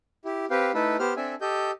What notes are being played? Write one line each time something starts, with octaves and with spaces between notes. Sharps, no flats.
E4 G4
C4 G4 B4 F5 G5
A3 D#4 E4 A4 B4
B3 G4 C5 F6
C4 D4 A4 E5 G#5
G4 A4 D#5 G6